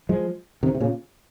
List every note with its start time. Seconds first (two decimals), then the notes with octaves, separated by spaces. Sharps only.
0.09 F3 G#3
0.63 C3 D#3
0.75 C3
0.81 A#2 C#3